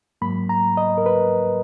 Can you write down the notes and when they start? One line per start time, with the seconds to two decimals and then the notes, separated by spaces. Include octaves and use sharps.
0.22 G#2 F#3 A#3 B5
0.49 A#5
0.77 D#5
0.98 A#4
1.06 B4